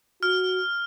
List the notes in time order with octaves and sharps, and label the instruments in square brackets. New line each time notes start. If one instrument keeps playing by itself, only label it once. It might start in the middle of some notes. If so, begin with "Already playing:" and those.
[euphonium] F#4 [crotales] F6